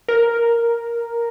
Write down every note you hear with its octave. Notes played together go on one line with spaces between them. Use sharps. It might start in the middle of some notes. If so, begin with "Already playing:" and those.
A#4